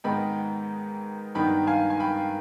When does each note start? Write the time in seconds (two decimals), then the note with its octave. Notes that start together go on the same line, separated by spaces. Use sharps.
0.04 G#2 D#3 B3 D#4 G5 B5
1.35 G2 D#3 B3 D#4 G5 B5
1.67 F5 G#5
1.90 G#5
2.00 G5 B5